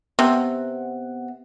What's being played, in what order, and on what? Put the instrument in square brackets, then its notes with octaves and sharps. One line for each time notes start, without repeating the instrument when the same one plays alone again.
[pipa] C3 [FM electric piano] B3 F#5